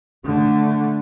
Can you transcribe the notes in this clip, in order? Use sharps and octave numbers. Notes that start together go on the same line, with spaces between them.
D3 A3